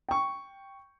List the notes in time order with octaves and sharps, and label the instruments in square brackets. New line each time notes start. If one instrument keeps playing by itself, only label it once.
[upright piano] G5 C#6